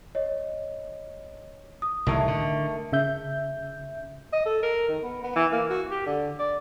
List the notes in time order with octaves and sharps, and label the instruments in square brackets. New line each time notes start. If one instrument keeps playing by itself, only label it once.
[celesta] C#5 D#5
D#6
[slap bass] C2 A2 E3 [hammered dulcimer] D#3 A3
[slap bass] D3
[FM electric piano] C#3 E5 G6
[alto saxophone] D#5
A4
A#4
D#3
B3
B3
E3
A#3
F#4
G4
D3
D5